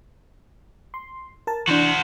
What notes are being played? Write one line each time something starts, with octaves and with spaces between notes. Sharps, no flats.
C6
A#4 A5
E3 D4 F#4 C5